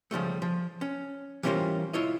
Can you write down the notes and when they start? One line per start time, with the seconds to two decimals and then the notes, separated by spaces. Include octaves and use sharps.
0.11 C#3 F3 G3 A3
0.42 F3
0.81 C#4
1.43 E3 G3 C#4 F4 A#4 C5
1.93 E4 F4 C#5 D#5